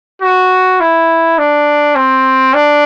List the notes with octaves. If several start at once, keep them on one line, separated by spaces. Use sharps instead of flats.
F#4
E4
D4
C4
D4